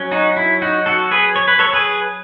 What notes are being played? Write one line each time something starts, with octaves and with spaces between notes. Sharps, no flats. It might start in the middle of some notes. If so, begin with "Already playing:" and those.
Already playing: F#3 C#4
D#4 F#4
E4
D#4 F#4
F#4 A4
G#4 B4
C#5
B4
A4 C#5
G#4 B4